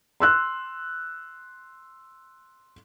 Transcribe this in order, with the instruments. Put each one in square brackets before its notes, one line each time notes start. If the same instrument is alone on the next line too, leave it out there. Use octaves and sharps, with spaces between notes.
[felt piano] C6 E6 F#6